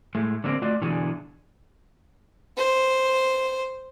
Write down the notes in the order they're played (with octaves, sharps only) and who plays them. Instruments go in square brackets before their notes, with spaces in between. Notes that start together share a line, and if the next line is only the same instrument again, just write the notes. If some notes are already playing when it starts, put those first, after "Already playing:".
[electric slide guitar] A2 G#3 A3
D3 G#3 A#3 C4 D4
A3 F4 F#4 D5 D#5
B2 D3 E3 D4 F#4 G#4
[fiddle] C5